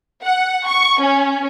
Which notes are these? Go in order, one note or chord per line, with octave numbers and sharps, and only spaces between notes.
F#5
C#6
C#4